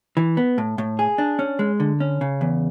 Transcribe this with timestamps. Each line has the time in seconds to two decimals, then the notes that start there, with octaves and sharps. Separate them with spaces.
0.17 E3
0.37 B3
0.58 A2
0.78 A2
0.99 G#4
1.18 D4
1.39 C#4
1.59 G#3
1.80 D3
2.00 C#4
2.21 C#3
2.41 E2